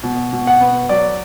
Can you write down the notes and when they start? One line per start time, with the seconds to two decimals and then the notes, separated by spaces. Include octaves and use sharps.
0.04 B2
0.33 B2
0.47 F#5
0.61 B3
0.89 F#3 D5